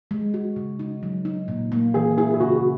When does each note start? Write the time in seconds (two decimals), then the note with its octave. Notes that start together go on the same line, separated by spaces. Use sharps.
0.11 G#3
0.34 F#4
0.56 C#3
0.79 D#4
1.03 F#3
1.25 D#4
1.48 A#2
1.72 A#3
1.94 E3 G#4
2.17 E4 G#4
2.34 G#4
2.40 C#3 F#4
2.55 F#4